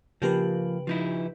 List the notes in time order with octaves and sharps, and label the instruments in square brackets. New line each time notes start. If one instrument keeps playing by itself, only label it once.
[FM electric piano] C#3 G4 B4 [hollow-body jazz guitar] F3 A#3
[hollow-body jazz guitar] F3 D#4 E4